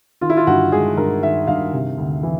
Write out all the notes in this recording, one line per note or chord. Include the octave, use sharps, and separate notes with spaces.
D#3 F4
E4
F4
G2 F#4
G#3 G#4
G2 A#4
D#3 E5
G2 F5
C3
D2
E3